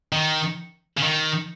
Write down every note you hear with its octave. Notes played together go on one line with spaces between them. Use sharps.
D#3
C#3
D#3